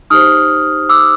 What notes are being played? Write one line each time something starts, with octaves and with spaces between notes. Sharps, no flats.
D#4 G4 C5 D#6 F6
D6 E6